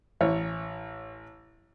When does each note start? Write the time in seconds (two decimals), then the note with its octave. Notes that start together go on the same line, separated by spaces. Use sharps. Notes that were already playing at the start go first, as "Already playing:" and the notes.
0.21 A1 C#5